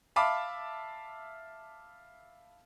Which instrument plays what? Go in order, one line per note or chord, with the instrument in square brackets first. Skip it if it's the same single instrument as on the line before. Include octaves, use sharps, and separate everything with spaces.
[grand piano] E5 F5 A5 B5 D6